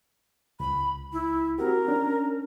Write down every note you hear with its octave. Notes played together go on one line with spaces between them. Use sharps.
C#2 B5
E4
C4 F#4 G4 A#4
C#4 D4